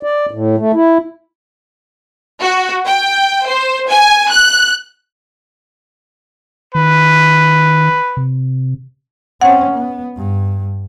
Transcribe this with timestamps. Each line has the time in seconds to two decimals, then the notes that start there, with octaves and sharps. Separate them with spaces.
0.03 D5
0.31 A2
0.58 A3
0.73 E4
2.42 F#4
2.87 G5
3.48 C5
3.91 G#5
4.31 F#6
6.75 D#3 B4
8.17 C3
9.41 C4 C#4 F#5
9.71 B3
10.17 G2